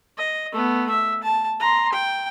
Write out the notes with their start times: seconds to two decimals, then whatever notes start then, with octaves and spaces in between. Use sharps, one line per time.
0.18 D#5
0.52 A3 B3
0.90 E5
1.23 A5
1.60 A#5 C6
1.93 G5